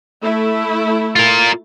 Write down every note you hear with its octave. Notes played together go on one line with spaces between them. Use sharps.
A3 E4
F4 A#4